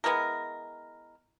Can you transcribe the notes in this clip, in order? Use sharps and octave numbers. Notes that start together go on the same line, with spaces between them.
G#3 B3 E4 A#4